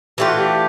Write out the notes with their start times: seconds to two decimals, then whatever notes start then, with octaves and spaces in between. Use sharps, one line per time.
0.18 E3 A3 D4 F4 G4
0.29 F#4
0.39 G4